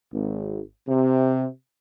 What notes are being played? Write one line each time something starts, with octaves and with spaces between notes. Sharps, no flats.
G#1
C3